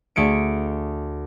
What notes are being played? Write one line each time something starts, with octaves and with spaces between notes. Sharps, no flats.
D2 A3 G#4 C#7 D7